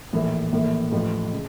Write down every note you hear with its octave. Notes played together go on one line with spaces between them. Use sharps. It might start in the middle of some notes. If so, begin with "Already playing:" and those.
A#1 A2 E3 A#3
A#1 A2 E3 A#3
A1 A2 F3
C#3